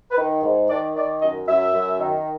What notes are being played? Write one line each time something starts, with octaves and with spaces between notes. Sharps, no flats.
B4
D#3
G#2
D#3 D5
D#3 D5
F#2 D#5
F#2 E5
F#2
D#3